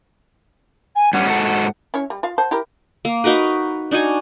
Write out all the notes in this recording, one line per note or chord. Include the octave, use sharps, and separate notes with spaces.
G#5
G2 G3 C#4 F#5
G#2 F#4 A4
C#4 E4 C#5
G3
F4 F5
C5 F#5 A5
E4 G4 A#4
A#3
D#4 F#4 A#4 B4
D4 D#4 F#4 G#5